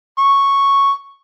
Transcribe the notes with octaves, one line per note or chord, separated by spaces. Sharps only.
C#6